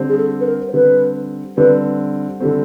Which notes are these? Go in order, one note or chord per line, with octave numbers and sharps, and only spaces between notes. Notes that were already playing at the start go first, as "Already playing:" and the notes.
Already playing: D3 G3 C4
G#4
A4
B4
A#4
C5
D3 G3 C4 B4
D3 G3 C4 B4
D3 G3 C4 A4